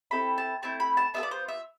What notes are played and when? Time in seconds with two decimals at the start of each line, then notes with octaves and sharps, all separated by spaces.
0.11 C4 E4 A4 B5
0.38 A5
0.63 A3 C4 E4 A5
0.80 B5
0.97 A5
1.14 B3 F4 A4 E5
1.23 D5
1.31 C5
1.48 E5